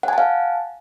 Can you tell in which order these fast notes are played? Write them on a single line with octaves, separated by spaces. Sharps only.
F#5 G#5 A5 F5